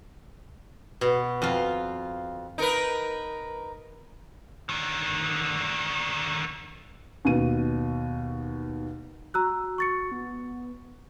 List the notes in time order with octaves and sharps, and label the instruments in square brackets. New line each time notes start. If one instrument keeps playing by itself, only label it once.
[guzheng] B2
F2 F4
[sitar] D#4 A#4 B4
[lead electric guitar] D3 D#3
[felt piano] D#2 B2 D#7
[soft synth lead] F#4 [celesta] A#5 E6 F#6
[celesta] C#6 A6 C#7
[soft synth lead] B3